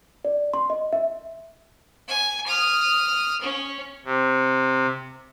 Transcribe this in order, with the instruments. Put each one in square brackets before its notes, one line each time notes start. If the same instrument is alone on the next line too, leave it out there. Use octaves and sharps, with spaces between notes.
[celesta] D5
C6
D#5
E5
[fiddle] G#5
D#6 F6
C#4
[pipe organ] C3